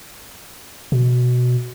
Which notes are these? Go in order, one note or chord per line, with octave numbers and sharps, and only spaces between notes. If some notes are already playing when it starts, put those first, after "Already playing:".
B2